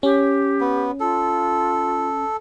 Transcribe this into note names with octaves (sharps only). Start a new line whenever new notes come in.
C#4 G4
B3
F4 A4